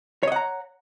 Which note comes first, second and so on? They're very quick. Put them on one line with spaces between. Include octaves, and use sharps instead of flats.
C#5 D#5 F#5 A#5